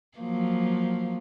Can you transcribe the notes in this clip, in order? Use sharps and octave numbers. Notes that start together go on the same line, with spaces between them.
F3 F#3 A#3